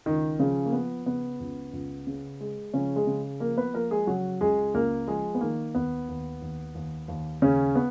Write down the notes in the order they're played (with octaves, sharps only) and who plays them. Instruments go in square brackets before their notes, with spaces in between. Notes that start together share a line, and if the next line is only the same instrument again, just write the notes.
[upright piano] C#2 D#3 D#4
C#3 F3 C#4
A#3
F3 B3
C#3 B3
C#2
C#2
C#3
G#3
C#3 F3 C#4
G#3 G#4
C#3
F3 A#3 A#4
B3 B4
F3 A#3 A#4
G#3 G#4
C#3 F#3 F#4
C#2 G#3 G#4
C#2 A#3 A#4
F3 G#3 G#4
B3
D#3 A#3
D#2 B3
D#2
D#2
D#2
D#2
D#2 C#3 C#4
B3